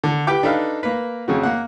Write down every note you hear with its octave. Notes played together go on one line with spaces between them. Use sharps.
D3
G4 B4 G5 D6
D4 D#4 A4 B4 F5
A#3 A#4 B4
F2 C#3 F#4
A#3 F#5